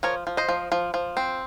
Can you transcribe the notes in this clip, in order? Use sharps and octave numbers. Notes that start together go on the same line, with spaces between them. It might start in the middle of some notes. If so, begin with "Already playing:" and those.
F3 A#4 C#5
F3
C5 D#5
F3
F3
F3
C4